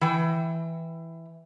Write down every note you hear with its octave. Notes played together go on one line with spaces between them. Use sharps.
E3 G5